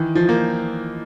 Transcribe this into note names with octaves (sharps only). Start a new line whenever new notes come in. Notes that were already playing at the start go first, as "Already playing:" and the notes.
Already playing: D#3 E3
F3
A#3